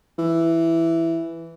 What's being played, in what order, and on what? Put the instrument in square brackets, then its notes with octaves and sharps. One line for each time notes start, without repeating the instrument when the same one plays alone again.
[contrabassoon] E3